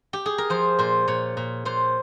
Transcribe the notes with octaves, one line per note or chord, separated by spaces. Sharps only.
G4
G#4
A#4
F3 C5
A#2 C5
A#2 C#5
A#2
A#2 C5